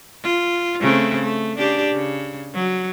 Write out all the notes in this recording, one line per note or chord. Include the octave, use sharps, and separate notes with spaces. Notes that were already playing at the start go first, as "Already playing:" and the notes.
F4
C#3 A3 C4
A3
C#3 D4 G4
C#3
F#3